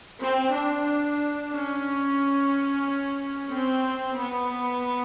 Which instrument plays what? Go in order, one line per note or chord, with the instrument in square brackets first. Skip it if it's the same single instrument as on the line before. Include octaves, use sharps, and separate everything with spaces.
[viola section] C4
D4
C#4
C4
B3